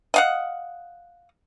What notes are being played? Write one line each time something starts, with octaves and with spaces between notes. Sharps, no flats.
D#5 F5 F#5